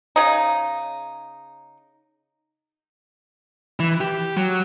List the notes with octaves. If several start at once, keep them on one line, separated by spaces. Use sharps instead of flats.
C#3 D#4
E3
G4
F#3